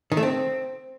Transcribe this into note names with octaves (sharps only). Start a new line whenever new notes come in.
D#3
A3
C4